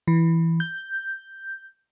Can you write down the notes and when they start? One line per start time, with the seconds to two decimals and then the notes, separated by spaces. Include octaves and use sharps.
0.07 E3
0.60 G6